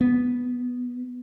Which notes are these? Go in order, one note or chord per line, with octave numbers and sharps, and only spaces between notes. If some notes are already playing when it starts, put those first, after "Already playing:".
B3